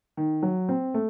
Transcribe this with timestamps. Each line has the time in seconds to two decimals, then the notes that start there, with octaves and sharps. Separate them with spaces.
0.17 D#3
0.43 F#3
0.69 C4
0.94 A3